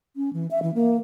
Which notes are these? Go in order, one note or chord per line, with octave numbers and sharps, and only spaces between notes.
C#4
E3
E5
E3
A#3